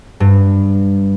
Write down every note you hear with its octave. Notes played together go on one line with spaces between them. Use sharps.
G2